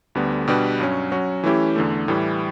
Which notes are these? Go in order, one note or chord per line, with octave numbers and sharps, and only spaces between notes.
D2 D3 G3 B3
B2 G3 D4 G4 B4
G2 F#3 C#4
F#3 C#4 F#4
E3 A3 C#4 E4 G4
E2 D3 A3
A2 E3 G3